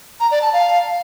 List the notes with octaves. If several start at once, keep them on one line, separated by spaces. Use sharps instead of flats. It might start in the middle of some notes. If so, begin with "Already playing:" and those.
A#5
D5
A5
F5